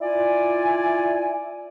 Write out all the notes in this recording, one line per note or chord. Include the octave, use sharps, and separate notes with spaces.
E4 F4 D5 G#5